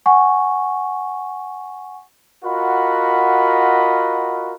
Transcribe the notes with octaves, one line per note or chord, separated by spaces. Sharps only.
F#5 G#5 C#6
F4 F#4 A#4 D#5 F#5 B5